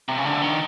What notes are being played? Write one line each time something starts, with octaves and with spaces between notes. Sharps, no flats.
C3
C#3
D3
D#3